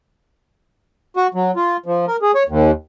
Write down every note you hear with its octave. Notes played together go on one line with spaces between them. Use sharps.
F#4
F#3
F4
F3
A#4
G#4
C#5
D#2